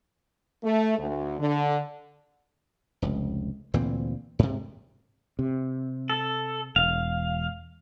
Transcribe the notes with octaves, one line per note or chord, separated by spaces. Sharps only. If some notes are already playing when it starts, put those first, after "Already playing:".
A3
D2
D3
F1 C#2
D2 A#2 E3 C4
G#2 C3
C3
A4
E1 F5